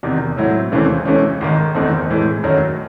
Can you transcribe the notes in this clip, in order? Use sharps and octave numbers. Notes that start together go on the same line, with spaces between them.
E2 C3 D#3
A2 F#3 C4 E4
D#2 C#3 E3 A3 C4
C#2 C#3 E3 A3 C#4
G#1 G#2 D#3
F#1 E2 D#3 A3 C4
A2 E3 G#3
F#2 D#3 F#3 A3 C#4